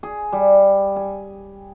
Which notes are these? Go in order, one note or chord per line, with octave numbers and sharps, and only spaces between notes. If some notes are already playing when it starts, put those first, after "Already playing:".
G#4
G3
G#5